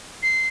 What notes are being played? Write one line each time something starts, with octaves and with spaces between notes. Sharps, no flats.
C7